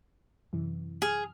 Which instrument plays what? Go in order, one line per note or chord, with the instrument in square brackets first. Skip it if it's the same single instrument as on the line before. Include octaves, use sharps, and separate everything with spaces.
[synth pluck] F#2 C3 E3
[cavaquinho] G#4 [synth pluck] F6